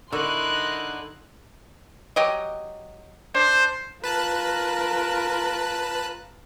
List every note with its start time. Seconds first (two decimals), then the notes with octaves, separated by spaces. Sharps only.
0.13 D3 D#4 E4 A#4 C6 C#6 E6 F#6
2.16 F#3 G4 D#5
3.35 D4 C5
4.04 F4 A#4 B4 A5 F#6